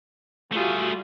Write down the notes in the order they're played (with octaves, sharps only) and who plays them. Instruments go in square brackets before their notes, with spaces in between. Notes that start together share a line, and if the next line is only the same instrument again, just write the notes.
[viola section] G3 F4 F#4 [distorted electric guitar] A3 G#4